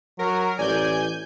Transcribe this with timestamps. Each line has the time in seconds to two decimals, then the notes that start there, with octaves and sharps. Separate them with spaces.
0.19 F#3 A#4
0.59 A1 D5 G#5 G6